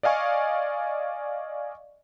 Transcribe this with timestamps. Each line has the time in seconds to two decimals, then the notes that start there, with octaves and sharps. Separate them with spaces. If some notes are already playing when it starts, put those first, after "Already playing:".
0.03 D5 D#5 F5 G#5 C#6